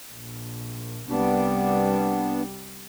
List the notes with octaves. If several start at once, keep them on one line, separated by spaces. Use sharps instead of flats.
A#1
C2 G3 B3 D4